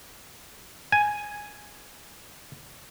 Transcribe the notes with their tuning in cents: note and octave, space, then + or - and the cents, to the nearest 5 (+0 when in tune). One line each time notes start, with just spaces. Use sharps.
G#5 +0